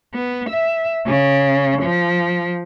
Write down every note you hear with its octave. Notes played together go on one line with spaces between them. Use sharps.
B3
E5
C#3
F3